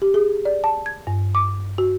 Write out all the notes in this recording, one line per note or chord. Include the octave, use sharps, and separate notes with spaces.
G4
G#4
D5
A5
G#6
G2
D6
F#4